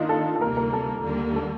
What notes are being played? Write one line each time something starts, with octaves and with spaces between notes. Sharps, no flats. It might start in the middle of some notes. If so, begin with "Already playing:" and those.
Already playing: D#3 A#3 D4 D#4 F4
A4
A4
D2 C3 G3 A#3 A#4
A#4
A4
D#2 D3 G3 A#3
A4